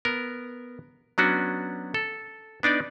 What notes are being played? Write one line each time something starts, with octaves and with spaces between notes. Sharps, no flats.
B3 A#4
F#3 B3 C#4 D4 F#4
A4
B3 D4 D#4 D5